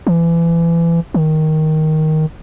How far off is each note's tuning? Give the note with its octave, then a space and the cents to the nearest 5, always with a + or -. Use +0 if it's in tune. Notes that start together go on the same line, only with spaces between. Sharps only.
E3 +30
D#3 +5